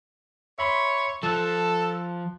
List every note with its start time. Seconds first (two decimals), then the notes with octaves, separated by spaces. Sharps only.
0.59 C#5 E5 B5 C6
1.23 F3 A4 A5 F#6